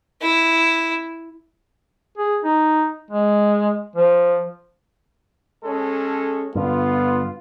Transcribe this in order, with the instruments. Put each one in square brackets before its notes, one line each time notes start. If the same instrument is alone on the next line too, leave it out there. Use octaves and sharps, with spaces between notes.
[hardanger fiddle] E4
[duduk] G#4
D#4
G#3
F3
[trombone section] G#3 C#4 A4
[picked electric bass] G2 D3 [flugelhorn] B3 [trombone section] F4